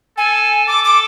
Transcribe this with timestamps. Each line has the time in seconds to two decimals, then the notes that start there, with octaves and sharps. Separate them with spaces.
0.18 A4 G#5
0.67 A4 D6
0.84 D6